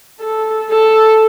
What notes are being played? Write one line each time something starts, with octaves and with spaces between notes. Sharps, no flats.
A4
A4